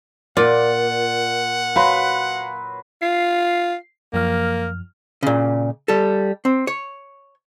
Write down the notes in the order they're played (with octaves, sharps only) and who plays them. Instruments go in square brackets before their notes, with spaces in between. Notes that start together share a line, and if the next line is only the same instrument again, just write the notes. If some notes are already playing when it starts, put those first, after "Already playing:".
[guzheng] A#2 [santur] F4 [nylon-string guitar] D5 [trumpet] F#5
[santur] F#3 B4 C6 [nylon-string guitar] F5
[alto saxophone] F4 [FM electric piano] C7
[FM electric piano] F#2 F3 F6 [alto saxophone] A#3
[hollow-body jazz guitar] A#2 C#3
G3 A4
C4
C#5